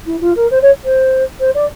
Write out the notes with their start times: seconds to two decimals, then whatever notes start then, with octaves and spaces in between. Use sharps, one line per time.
0.05 E4
0.20 F4
0.35 A#4
0.50 C5
0.62 C#5
0.84 C5
1.39 C5
1.54 D5